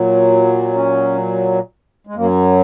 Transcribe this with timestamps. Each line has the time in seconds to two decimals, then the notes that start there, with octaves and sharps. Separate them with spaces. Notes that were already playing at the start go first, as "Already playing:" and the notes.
Already playing: A#2 F#3
0.74 C#4
2.07 G#3
2.15 F#2 F#3 A#3